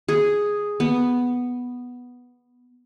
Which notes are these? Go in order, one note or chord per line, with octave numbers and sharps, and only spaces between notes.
G#4
B3